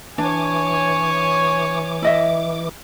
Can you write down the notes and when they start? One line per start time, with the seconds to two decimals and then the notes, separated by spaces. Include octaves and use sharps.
0.18 E3 D4 C#5 G#5 D6
2.02 E4 D#5 E5